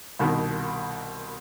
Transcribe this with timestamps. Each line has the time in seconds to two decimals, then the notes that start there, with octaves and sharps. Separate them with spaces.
0.19 C2 B2 D#3